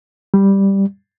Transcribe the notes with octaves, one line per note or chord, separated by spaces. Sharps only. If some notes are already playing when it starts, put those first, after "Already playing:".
G3